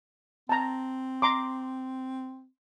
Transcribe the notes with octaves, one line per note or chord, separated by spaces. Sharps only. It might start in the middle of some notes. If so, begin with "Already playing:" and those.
C4 A5 A#5
A#5 C6 D6